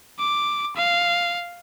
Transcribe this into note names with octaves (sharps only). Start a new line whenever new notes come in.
D6
F5